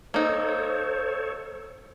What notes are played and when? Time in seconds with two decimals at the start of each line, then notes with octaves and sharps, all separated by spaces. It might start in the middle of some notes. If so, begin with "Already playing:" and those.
0.14 A#3 D#4 A4 C5 C#5